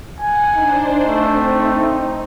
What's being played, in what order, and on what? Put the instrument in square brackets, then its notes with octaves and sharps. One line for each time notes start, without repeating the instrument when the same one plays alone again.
[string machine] F#5 [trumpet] G#5
[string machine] D4 C5 [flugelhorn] D#4
[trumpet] A3
[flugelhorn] C4 [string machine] D#4